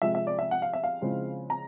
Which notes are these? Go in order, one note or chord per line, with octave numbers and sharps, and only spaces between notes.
C3 F3 G#3 E5
E5
D5
E5
F#5
F5
E5
F5
C#3 F3 G#3 C4 E4
A#5